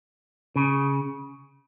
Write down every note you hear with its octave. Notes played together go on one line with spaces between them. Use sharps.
C#3